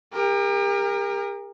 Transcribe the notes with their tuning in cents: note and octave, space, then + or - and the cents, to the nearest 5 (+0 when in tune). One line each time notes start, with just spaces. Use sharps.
G4 +40 A#4 +0